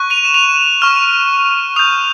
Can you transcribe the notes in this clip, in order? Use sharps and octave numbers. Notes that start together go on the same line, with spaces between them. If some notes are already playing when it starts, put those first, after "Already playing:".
Already playing: C#6 F#6
D#7 F7
E7
D#7 F7
C#6 F6
D#6 G6 D#7 F7